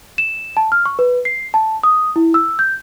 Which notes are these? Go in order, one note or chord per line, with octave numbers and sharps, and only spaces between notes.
E7
A5
F6
C#6
B4
C7
A5
D#6
E4
E6
G6